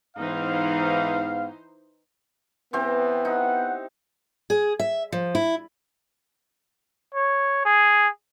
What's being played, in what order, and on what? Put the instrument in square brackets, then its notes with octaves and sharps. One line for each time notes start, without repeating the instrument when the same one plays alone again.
[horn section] G#2 B3 F5 [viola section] E3 D#4 C5
[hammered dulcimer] E3 C4 G4 [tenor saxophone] B3
[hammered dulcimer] D#4 [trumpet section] F#5
[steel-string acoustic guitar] G#4
E5
F3
E4
[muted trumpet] C#5
G#4